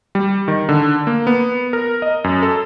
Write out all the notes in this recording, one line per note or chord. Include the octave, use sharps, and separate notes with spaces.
G3
D#3
D3
A#3
B3
A#4
D#5
F#2
A4